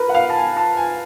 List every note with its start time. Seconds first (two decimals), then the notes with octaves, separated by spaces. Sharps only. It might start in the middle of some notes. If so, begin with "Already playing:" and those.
Already playing: A#4 B4
0.09 F#5
0.14 F5
0.29 A5
0.36 G#5
0.57 A5
0.77 G#5